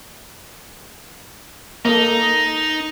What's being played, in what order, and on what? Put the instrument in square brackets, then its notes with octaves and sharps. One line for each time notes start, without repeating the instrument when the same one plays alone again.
[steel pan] A#3 A4 [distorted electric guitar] D#4